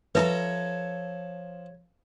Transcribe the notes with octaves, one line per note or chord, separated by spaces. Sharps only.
F3 A4 B4 C#5 E5 G#5 A#5